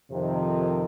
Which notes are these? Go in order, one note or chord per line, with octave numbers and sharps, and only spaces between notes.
F2 C3 D#3